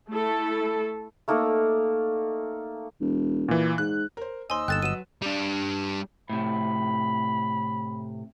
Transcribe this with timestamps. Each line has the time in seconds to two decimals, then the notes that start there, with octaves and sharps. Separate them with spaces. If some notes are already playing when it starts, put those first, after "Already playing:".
0.10 A3 E4 A4
1.28 A3 A#3 D#4 A4
3.00 E1
3.48 A#2 E3
3.78 G#2 F#6
4.17 A#4 C5
4.50 D#2 C5 D#5 G#5 C6 E6
4.68 G1 D#2 A4 G5 F#6 A6 E7
4.82 F#3 B4 F#5 D#7 E7
5.22 G3 D4
6.30 A2 C3 B5